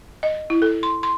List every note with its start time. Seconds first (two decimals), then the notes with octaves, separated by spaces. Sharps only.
0.23 D#5
0.50 E4
0.62 A4
0.83 C6
1.03 C6